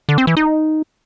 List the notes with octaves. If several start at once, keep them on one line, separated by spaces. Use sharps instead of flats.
D3
C4
E3
D#4